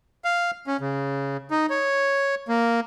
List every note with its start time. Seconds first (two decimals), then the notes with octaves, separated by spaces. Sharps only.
0.24 F5
0.67 C#4
0.81 C#3
1.51 D#4
1.70 C#5
2.48 A#3